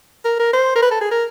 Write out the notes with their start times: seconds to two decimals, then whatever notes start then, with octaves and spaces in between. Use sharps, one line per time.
0.24 A#4
0.39 A#4
0.53 C5
0.75 A#4
0.82 B4
0.91 A4
1.01 G#4
1.11 A#4